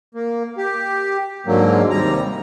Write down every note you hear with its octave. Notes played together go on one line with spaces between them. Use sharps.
A#3
G4
G#2 D3 F#3 A#3
D#2 C3 G3 A#5